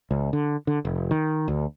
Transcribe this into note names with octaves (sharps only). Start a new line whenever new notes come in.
C#2
D3
D3
F1
D#3
D2